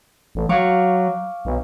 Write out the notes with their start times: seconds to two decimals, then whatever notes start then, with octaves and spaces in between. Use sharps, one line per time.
0.35 A1
0.49 F#3 F5 C#6 D6
1.45 B1